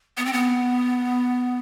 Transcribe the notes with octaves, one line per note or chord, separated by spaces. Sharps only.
B3
C4
B3